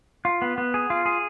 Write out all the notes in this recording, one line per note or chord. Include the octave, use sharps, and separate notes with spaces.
F4
B3
B3
G#4
F4
G#4